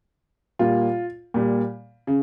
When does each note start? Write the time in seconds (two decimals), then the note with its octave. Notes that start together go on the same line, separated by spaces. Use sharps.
0.59 A#2 G3 F4
1.34 A#2 G3
2.07 C#3